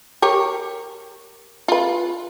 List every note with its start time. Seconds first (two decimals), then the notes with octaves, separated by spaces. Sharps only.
0.22 G4 A#4 C#5
1.68 F4 B4